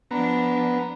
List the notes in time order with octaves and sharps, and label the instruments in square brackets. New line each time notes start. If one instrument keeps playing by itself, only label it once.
[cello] F3 D4 [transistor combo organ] B3 A#5